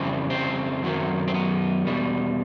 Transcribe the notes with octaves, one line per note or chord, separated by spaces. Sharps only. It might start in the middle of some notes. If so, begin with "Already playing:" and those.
Already playing: F2 C#3 E3 G3 C4
C4
F#2 D#3 F#3
C4
B3
E2 B2 G3